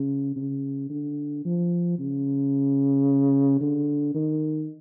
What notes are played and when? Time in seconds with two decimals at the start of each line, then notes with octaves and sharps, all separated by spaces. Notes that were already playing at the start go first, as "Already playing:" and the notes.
Already playing: C#3
0.36 C#3
0.90 D3
1.45 F3
1.99 C#3
3.61 D3
4.14 D#3